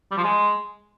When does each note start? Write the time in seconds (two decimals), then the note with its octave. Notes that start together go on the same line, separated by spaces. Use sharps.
0.12 G3
0.18 F3
0.24 G#3